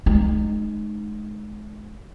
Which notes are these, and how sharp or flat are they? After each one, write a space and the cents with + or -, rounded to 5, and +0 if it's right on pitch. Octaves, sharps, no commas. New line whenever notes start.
G#3 +30 D#4 -20